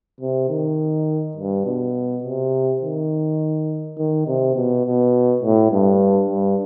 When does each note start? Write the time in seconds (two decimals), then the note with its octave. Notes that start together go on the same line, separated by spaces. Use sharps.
0.20 C3
0.49 D#3
1.37 G2
1.65 B2
2.24 C3
2.82 D#3
3.98 D#3
4.27 C3
4.56 B2
4.85 B2
5.43 A2
5.72 G2
6.30 G2